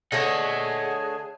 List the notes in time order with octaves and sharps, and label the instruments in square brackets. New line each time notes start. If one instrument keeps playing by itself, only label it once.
[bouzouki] D3 A3 C#5 [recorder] G#4 [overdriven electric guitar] D#5 F#5